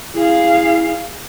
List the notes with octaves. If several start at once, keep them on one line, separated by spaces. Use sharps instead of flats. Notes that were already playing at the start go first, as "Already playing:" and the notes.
E4 G#4 F5